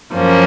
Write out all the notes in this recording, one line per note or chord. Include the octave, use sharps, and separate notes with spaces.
F#2 F3 A#3 C#4